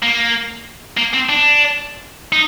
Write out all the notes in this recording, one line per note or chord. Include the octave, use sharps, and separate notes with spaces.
A#3
A#3
C4
D4
D#4